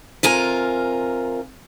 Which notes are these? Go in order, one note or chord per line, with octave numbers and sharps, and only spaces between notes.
C3 F4 A#4 G#5